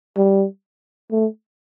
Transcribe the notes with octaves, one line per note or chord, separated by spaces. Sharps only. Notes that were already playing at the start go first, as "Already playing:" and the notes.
G3
A3